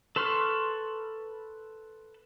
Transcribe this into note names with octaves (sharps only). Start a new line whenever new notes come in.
A4 B4 C6 C#6 F6